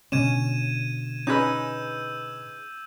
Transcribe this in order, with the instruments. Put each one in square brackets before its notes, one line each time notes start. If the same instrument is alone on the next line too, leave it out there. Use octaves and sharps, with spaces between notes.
[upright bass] B2 D3 [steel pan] C#4 [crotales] G#6 D#7 E7
[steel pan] C#4 [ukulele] D#4 G#4 B4 [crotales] E6 G6